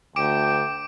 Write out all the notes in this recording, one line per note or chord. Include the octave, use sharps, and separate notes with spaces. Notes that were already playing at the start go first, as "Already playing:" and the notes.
D2 G5 D6 D7